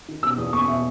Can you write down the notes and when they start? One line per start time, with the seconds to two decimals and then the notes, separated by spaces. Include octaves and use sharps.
0.09 D#3
0.23 B2 E6
0.38 E2 D#6
0.53 E2 C#6
0.68 B2 E5